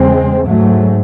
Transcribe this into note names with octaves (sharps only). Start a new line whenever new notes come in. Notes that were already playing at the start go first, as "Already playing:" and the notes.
Already playing: E2 C#3 G#3 C4
G#2 F#3 A3